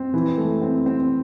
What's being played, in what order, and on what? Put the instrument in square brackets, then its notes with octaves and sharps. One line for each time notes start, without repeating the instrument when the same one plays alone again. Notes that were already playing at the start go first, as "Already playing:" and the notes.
Already playing: [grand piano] C4
E3
A3
C4
C4